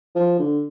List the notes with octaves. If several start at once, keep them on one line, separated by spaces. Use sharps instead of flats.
F3
D3